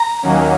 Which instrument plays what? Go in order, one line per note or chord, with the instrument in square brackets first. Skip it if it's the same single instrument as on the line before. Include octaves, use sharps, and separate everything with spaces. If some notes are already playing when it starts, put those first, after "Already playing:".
Already playing: [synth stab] A#5
[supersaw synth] D#2 D#3 F#3 A#3 C#4